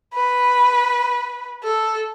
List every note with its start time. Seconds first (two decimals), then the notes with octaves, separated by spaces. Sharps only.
0.14 B4
1.63 A4